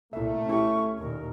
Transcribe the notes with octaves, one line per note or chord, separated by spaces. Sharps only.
C2 A#2 A3 E4 E5
C#4 E4 G4 C#6
D#2 A#2 A#4